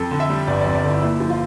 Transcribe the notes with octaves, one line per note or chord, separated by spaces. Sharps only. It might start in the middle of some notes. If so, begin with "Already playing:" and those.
Already playing: F2 A4
D3
E5
G3
G1 D5
F2 D5
D5
D3 E4
A#2 E4
F3
F4